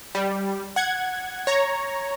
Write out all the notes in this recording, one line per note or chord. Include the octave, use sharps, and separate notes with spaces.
G3
F#5 G#6
C#5 A#5